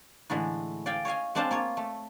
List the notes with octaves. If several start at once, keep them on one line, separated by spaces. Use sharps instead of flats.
A2 D3 E3 G#3
D5 F5 G5 G#5
C#5 D#5 F5 G#5
G#3 C4 D4 C5 F5 A5
A#3 F4 C#5
A3